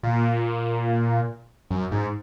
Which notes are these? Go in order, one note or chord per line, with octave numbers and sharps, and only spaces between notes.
A#2
F#2
G#2